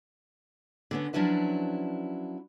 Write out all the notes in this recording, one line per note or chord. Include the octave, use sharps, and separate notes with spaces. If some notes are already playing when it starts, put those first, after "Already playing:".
D3 B3 C#4
F3 F#3 C#4 D4 E4 B4